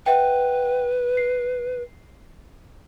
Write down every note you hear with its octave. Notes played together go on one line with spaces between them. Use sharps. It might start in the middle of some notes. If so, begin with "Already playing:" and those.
B4 E5 F#5 G5
C7